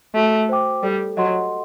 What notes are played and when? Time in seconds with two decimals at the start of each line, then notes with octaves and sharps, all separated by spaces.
0.15 A3 F#4
0.49 C5 G5 D6
0.83 G3 A4
1.17 F#3 D#5 F#5 C6